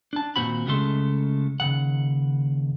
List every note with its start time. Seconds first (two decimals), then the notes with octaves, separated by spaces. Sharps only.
0.13 D4 A5
0.36 D#2 A#2 C4 F#4 B5
0.66 C#2 C#3 G#3 A3 A4 C6
1.60 D#2 C#3 F#5